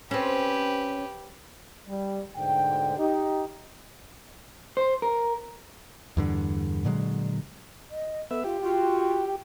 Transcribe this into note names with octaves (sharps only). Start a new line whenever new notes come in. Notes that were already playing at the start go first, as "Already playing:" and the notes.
C4 C#4 G4 B4
G3
D2 G#2 B2 D3 G5
D#4 G4
C5
A#4
E2 G2 D3
A#2 D3 F#3 G#3
D#5
B3 A4 E5
F4 G4
F4 F#4 G5